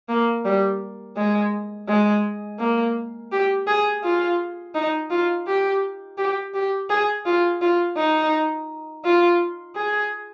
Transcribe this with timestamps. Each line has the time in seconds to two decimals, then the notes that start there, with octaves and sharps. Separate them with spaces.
0.09 A#3
0.44 G3
1.16 G#3
1.88 G#3
2.59 A#3
3.32 G4
3.67 G#4
4.03 F4
4.74 D#4
5.10 F4
5.46 G4
6.18 G4
6.54 G4
6.89 G#4
7.26 F4
7.61 F4
7.96 D#4
9.04 F4
9.76 G#4